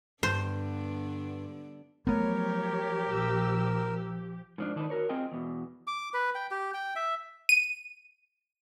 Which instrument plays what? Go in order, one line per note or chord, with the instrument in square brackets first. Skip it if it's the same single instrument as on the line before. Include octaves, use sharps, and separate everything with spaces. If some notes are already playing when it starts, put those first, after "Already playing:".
[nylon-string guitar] G2 [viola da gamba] D3 B3 D4 [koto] C5
[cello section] F3 G4 [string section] F#3 C#5 [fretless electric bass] A3 B3 [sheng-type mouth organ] A#4
[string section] A#1 E6
[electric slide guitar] G#2 F3 D4
D#3 D4 D#4 A#4 B4
F#4 A#4 C#5
C4 F4 G#4 D#5 G5
E2 B2
[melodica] D6
B4
G5
G4
G5
E5
[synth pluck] D#7